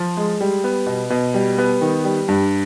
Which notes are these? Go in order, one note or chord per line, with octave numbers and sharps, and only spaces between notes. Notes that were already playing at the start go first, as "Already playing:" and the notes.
Already playing: F3
G#3
G3
B3
B2
B2
G3
B3
D#3
G3
G2